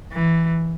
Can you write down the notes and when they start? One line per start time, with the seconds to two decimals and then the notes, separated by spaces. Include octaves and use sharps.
0.12 E3